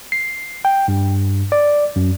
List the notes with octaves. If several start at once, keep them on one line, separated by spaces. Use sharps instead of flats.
C7
G5
G2
D5
F#2